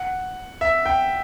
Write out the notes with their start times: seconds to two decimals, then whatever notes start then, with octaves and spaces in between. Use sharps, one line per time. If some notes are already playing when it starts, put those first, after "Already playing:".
Already playing: F#5
0.61 E5
0.86 G5